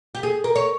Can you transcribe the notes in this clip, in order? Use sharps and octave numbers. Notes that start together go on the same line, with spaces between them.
G4
G#4
A#4
C#5